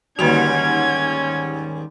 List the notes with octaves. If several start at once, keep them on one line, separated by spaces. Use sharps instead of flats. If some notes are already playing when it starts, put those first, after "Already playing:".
D#2 G#2 D3 G3 A#3 C#4 F#4 G#6